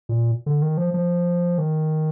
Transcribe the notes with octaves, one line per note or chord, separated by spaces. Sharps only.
A#2
D3
D#3
F3
F3
D#3